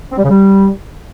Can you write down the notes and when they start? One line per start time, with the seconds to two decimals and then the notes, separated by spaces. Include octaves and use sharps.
0.12 C4
0.18 G3
0.24 C#3
0.30 G3